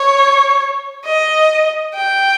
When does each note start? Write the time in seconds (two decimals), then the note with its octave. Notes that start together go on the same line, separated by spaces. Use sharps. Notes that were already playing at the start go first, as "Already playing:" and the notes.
Already playing: C#5
1.05 D#5
1.95 G5